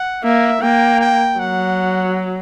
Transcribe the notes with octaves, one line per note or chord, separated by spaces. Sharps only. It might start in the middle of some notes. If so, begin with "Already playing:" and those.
Already playing: F#5
A#3 E5
A#3 G5
G5
F#3 F#5